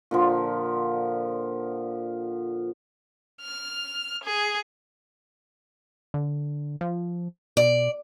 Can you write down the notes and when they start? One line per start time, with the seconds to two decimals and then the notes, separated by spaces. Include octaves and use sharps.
0.11 A#2 D3 F3
3.41 F6
4.24 G#4
6.14 D3
6.81 F3
7.57 B2 D5